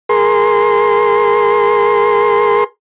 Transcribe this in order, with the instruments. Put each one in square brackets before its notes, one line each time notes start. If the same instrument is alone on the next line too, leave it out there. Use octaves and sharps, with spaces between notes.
[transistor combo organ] G#4 A#4 C6